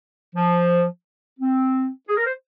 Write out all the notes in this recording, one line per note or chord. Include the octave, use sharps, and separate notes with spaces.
F3
C4
G#4
A#4
C5